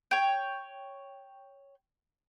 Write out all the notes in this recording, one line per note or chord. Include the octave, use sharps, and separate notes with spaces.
C#5 G5